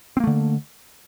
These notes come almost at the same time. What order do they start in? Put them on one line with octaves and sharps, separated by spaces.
C4 A#3 A3 D3